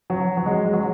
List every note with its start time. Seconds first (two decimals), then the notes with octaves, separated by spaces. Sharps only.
0.10 F#3
0.37 F#3
0.46 G#3
0.65 G#3
0.73 F#3